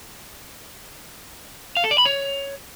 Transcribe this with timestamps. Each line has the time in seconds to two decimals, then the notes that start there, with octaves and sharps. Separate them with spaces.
1.77 F5
1.84 A4
1.91 D5
1.98 B5
2.05 C#5